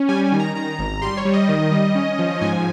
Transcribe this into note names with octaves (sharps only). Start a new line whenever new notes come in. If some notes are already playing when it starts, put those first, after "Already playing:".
Already playing: C#4
G3 G#5
G#5
D#3
A#5
D#3 A#5
G#1
G3 C6
C#5
G3
D#5
D#3
G3
C#4
F3
G#2 G#5